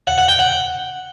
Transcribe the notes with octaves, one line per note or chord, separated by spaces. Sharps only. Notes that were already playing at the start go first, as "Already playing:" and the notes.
F#5
F#5
G5
F#5